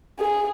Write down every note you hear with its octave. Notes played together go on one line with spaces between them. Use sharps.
G#4